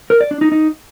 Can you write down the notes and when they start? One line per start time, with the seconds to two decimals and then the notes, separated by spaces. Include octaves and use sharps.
0.10 A#4
0.20 D5
0.31 D4
0.41 D#4
0.52 D#4